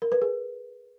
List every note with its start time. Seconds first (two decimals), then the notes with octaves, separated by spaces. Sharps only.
0.02 A#4
0.12 B4
0.22 G#4